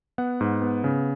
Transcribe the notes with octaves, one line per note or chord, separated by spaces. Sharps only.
B3 F#5
G#2
B3
C#3